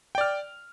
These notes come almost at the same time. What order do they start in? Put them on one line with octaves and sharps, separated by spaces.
G5 D5 F6